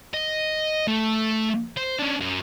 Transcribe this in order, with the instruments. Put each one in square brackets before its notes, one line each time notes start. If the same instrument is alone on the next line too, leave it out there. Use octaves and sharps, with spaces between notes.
[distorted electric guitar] D#5
A3
C5
C#4 D4
F#2